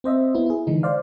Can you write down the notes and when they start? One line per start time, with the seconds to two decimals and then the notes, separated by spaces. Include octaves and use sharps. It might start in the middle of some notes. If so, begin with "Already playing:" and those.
0.04 C4 C5 D#5 E5
0.35 B3 E4
0.46 E4 G#4
0.67 D3 E3 G#3 D#4
0.83 C5 D5 F5